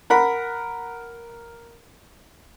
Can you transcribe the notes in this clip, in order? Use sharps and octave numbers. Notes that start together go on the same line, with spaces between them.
A#4 F#5 B5